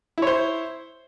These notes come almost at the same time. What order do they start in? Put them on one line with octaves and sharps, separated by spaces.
E4 C#5 C5